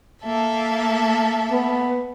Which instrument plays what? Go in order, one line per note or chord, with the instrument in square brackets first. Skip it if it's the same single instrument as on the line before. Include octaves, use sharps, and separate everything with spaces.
[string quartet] A#3 A4 E5
[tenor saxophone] B3